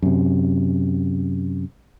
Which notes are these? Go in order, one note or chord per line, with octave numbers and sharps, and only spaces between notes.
F#2 C3